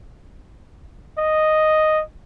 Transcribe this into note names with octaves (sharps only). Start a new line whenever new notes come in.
D#5